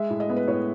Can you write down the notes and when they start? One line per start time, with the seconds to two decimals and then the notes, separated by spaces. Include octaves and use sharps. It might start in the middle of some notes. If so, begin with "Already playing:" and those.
Already playing: G#3 E5
0.10 A2
0.20 D#5
0.30 B3
0.36 B4
0.48 A2 C#5